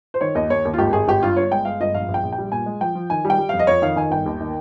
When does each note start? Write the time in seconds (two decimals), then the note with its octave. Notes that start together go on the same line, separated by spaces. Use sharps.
0.14 C5
0.21 D#3 C#5
0.35 D#2 D#5
0.50 D#2 C#5
0.65 D#2
0.74 F4
0.78 G#1 G4
0.93 G#1 G#4
1.08 G#1 G4
1.23 G2 F4
1.37 G1 C#5
1.51 G#3 G5
1.65 G#3 F5
1.81 G1 D#5
1.94 A#1 F5
2.09 A#1
2.14 G5
2.23 A#1
2.32 G5
2.38 G3
2.52 A#2 G#5
2.66 G#3
2.81 F3 G5
2.95 F3
3.10 D#3 G#5
3.25 G3
3.30 G5
3.38 G3
3.49 F2 F5
3.59 D#5
3.67 F2 C#5
3.82 D#3 F5
3.96 D#3 G#5
4.11 G1 G5
4.26 D#2
4.41 D#3